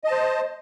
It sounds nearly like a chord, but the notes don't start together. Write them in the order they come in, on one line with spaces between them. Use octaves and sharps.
D#5 A5 C5